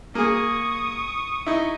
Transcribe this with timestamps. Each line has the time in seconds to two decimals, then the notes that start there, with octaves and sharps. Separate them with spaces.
0.15 A#3 G#4 C#6 D#6
1.46 D#4 E4